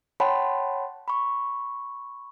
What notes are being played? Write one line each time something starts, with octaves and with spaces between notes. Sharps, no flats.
C#5 F#5 G5 A5 B5 C6
B5 C#6